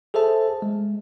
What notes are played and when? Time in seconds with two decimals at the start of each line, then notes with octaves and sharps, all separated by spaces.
0.14 G#4 A4 C5 E5 A5
0.62 G#3